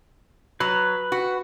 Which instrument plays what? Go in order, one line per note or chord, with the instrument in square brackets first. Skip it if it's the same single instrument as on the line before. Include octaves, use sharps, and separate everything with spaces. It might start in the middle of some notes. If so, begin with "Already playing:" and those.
[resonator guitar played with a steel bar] F#3 [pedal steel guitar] B4
[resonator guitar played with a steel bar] F#4